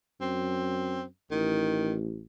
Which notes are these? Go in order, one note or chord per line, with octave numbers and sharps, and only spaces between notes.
F#2 C4
A1 D#3